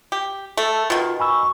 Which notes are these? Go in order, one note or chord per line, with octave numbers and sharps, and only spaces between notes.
G4
A3 A4
B2 D#3 F4
G#5 B5 C#6 E6